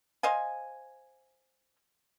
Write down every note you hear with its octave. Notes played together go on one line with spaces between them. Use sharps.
C5 D#5 F5 G#5